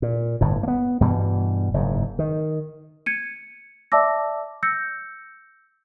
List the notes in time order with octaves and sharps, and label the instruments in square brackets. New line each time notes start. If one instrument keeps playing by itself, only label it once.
[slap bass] A#2
G1 A2
A#3 B3
G2 B2 E3 G3
F#1 G#2
D#3
[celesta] G#6 C#7 D#7
D5 E5 A5 D6 E6 A#6
E6 G6 A#6 C#7